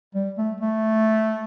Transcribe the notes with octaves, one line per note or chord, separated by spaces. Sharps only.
G3
A3
A3